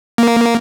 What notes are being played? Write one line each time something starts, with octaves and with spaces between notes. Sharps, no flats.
A#3